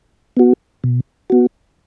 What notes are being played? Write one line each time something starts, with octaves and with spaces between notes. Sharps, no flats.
B3 F#4
B2
B3 F#4